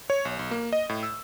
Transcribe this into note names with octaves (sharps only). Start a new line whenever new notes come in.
C#5
B1
B1
A#3
D#5
A2
E6